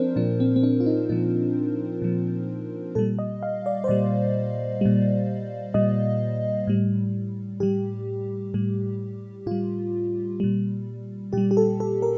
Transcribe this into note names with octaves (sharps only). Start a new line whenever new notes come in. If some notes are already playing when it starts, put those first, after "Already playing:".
Already playing: F3 C4 D4 A#4 C5
A#2 F3 D4
C4
C4
D4
F4
D#4
A#2 F3 D#4
A#2 F3
A#2 G3 A4
D#5
F5
D5
C5
A#2 G3 D5
A#2 G3
A#2 G3 D#5
A2 G3
A2 G3 G4
A2 G3
A2 G3 F4
A#2 G3
A#2 G3 G4
G4
A4
A4
A#4